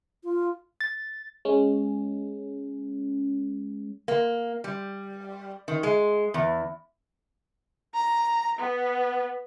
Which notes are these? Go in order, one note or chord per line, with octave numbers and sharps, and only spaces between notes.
F4
A6
G#3 C#4
A#3
G3
D#3
G#3
E2
A#5
B3